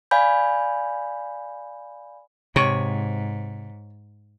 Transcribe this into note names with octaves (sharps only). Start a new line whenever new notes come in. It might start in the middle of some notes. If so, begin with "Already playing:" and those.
D5 F5 G#5 B5 G6
G#2 C3 C#5